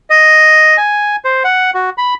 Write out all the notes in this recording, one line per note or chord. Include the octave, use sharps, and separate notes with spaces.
D#5
G#5
C5
F#5
F#4
B5